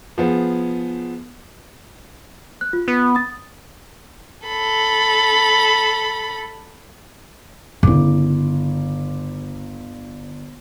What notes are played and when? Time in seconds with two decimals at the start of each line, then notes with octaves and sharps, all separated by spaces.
0.18 F3 B3 G#4
2.61 F#6
2.73 F4
2.88 B3
3.15 D#6 A6
4.48 A4 B5
7.83 G1 C#3 E4 D6